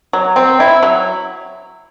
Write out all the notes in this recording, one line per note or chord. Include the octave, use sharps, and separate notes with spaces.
F#3
C4
E4
F#3